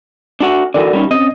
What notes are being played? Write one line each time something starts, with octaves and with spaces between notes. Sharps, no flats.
D4 F#4 F#5
D3 E3 F#4 A#4 D5
G3 C#4 D#4
C4 C#4 D#5